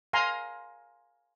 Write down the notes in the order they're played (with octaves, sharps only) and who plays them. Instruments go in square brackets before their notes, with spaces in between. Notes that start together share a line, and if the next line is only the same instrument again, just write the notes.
[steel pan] F5 G#5 A#5 C6